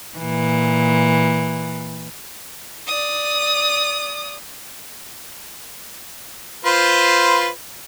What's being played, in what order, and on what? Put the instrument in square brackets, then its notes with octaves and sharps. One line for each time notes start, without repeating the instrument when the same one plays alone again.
[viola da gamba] A#2 E3
[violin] D5 D#6
[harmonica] F4 B4 C5